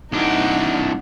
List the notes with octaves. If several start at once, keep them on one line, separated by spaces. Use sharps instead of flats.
C2 D4 D#4 F#5